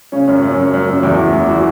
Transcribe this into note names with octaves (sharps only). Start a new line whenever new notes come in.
C#3 C#4
F#2
F#2
F#2
F#2
F#2
F#4
E2 E4
E2
E2
E3 F#4